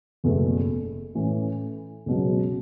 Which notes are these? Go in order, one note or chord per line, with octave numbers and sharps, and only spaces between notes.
F#1 E2 B2 A3
A2 E3 A3 C#4
C#2 B2 F#3